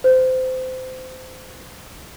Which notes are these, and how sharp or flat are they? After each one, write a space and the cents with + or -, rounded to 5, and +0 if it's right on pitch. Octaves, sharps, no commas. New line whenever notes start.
C5 -25